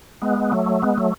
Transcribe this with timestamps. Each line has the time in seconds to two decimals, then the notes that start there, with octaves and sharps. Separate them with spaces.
0.22 G#3 B3
0.52 F#3 A3
0.82 G#3 B3
0.98 F#3 A3